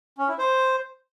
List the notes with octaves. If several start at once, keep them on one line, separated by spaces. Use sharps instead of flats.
C#4
E4
C5